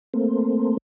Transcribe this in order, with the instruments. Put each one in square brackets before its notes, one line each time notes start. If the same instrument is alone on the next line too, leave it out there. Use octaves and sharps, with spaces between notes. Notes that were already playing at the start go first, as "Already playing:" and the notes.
[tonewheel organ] A3 A#3 C4